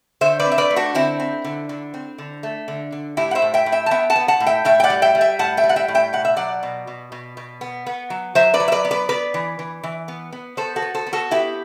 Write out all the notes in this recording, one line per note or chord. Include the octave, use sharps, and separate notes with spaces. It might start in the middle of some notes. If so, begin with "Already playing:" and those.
D3 C5 E5
B4 D5
C4
E5
B4 D5
A3
D4 F#4
D3 C4 E4
C4
D3
D3
C4
D3
A3
D3
D3
A2 E4 G4
F#5
C5 E5
A2
E5 G5
A2
E5 G5
A5
B3 E5 G5
F#5 A5
B3
F#5 A5
A2
E5 G5
A2 E5 G5
G5
D5 F#5
G3
E5 G5
G3
E5 G5
A2 F#5 A5
E5 G5
G3
F#5
E5 G5
A2
E5 G5
B2 F#5
E5
F#3 D5 F#5
B2
B2
B2
B2
B3
B3
F#3
F#3 C5 E5
B4 D5
F#3
E5
B4 D5
B3
B4 D5
B3 B4 D5
E3
E3
E3
B3
B3
B3 A4 C5
F#4 A4
B3
A4 C5
B3
F#4 A4
B3 E4 G4